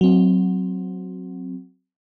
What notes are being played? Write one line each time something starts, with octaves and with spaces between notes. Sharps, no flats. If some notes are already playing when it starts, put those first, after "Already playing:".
F#3 C4